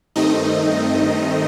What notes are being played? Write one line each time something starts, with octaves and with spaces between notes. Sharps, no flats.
G2 D#3 A3 C4 D#4 D#5